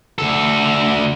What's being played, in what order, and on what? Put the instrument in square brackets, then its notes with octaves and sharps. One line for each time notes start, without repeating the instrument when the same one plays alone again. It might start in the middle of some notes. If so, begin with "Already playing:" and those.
[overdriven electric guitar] D2 A4